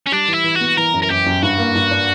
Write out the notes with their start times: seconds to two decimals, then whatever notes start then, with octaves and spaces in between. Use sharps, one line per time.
0.07 C#4
0.12 G3 D4
0.28 E3 E4
0.44 E3
0.55 F#4
0.60 B3
0.77 E3 A#4
0.94 F#2
1.02 A#4
1.10 F#2 G4
1.26 F#2
1.42 G2 F#4
1.58 A#3
1.75 G2
1.91 D4